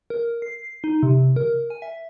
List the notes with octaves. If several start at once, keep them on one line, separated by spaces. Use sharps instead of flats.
A#4
C7
D#4
C3
A#4
G#5
E5